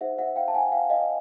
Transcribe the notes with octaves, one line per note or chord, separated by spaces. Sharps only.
D#4 G#4 C5 E5 F#5
E5 F#5
F5 G5
A5
F#5 G#5
F5 G5
D#5 F5